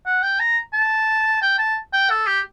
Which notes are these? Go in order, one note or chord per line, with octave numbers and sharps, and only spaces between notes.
F#5
G5
A#5
A5
G5
A5
G5
A4
G4